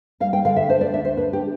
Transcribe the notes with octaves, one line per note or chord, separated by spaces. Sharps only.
G3 F5
G5
D3 F5
E5
D4 C5
D5
D2 E5
C5
D4 B4
G4